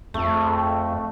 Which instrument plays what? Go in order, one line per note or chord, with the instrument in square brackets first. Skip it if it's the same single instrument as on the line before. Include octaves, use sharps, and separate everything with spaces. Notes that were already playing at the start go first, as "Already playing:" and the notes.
[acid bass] F2 [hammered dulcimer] A3